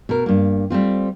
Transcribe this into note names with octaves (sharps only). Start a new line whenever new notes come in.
B2 A#4
G2 A#3
G3 A3 C4 F4